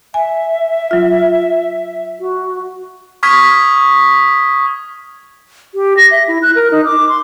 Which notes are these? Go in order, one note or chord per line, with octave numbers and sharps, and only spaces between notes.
E5 G#5
F#3 F4
F#4
C#6 D#6 F6 G#6 B6
G4
A#6
E5
E4
F#6
A#4
D#4
D6
C6